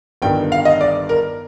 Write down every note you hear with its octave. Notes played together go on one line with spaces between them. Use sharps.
G1 G2 D#3 G5
F5
D#5
D5
A#4